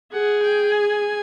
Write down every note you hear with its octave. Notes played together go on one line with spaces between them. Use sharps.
G#4 F#5
G5
G#5